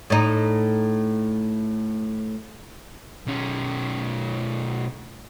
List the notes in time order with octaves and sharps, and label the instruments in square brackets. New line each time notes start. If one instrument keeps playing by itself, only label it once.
[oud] A2 D#4
[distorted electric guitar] B1 C#4